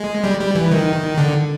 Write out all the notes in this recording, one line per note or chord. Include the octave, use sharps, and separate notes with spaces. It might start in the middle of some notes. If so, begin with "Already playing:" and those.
Already playing: G#3
G3
G3
E3
D#3
D3